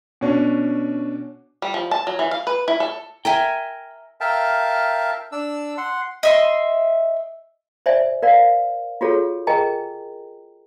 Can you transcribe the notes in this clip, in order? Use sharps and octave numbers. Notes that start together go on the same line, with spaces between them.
B2 C#4 D4
G3
F3
A5
F#3
E3
F5
B4
E4
A4
A#4 E5 G5 G#5
A#4 E5 F5 G5 A5
D4 E6
F#5 C6
D#5 E5 C6
C5 D5 E5 G#5
A#4 D5 F5
F4 F#4 G#4 A4 C#5
G#4 A#4 D#5 G5 G#5 A#5